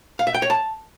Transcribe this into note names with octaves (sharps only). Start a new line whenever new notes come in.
F5
E5
G5
C#5
A5